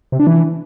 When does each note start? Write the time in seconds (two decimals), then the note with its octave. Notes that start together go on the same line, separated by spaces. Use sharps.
0.12 C3
0.20 D4
0.27 E3